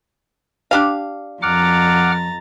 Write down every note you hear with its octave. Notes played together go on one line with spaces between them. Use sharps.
D4 G4 F5
F2 F#5 A#5 D6 F6 A6